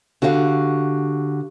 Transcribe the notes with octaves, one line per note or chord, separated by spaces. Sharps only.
D3 F#4 G4 E5 F5